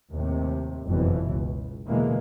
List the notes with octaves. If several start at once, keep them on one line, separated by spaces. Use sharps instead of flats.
D#2 A2 C3
F#1 F2 B2 E3
C#2
E2 B2 D3 E3 G#3 A#3